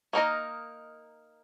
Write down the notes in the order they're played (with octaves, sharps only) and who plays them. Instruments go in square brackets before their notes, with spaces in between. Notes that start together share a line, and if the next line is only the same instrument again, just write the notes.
[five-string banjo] A#3 D#4 A#4 D#5